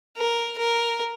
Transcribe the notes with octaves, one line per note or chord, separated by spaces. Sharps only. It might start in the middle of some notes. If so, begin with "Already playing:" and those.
A#4
A#4